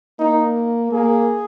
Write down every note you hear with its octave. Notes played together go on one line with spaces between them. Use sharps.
A#3 D#4
A#3 G#4